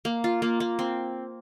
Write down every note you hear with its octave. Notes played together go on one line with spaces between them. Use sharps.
A#3
F4
A#3
A#3
C4